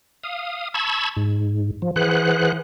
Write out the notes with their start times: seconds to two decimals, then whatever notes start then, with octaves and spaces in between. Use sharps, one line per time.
0.23 F5 D#6
0.74 A5 B5 C#6 E6 G#6
1.17 G#2
1.82 F3
1.96 E3 G#4 B4 C5 F#5 F#6